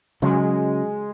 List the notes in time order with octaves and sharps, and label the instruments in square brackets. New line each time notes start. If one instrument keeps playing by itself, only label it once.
[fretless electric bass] C#3 F#3 [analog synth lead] G#3